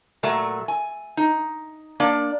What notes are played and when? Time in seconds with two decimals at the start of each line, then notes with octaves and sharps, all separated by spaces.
0.23 A#2 F#3 A3
0.68 G#5
1.17 D#4
2.00 A#3 D4 D5